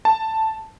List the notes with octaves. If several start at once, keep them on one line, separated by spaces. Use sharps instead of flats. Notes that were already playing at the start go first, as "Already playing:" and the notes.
A5